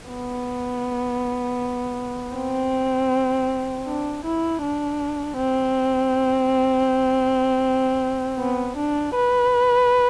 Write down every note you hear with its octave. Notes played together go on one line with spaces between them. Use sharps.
B3
C4
D4
E4
D4
C4
B3
D4
B4